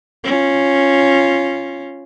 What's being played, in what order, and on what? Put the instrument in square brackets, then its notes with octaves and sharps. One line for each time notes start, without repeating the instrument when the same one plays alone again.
[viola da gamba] C#4 F4